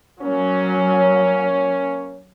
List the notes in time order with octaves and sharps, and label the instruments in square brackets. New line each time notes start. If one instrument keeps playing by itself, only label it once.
[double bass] F#3 [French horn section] A#3 C#4